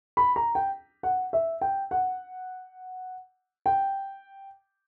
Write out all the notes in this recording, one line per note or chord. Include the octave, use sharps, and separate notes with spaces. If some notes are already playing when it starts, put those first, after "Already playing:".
B5
A#5
G5
F#5
E5
G5
F#5
G5